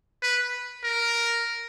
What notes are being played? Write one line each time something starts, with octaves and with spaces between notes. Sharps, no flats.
B4
A#4